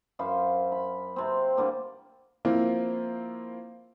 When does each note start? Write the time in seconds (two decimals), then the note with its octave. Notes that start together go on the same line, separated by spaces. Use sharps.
0.19 F#2 C5 F5 B5
0.72 B5
1.16 C3 C4
1.57 D3 G3 A#3
2.45 F3 A#3 C4 E4 F4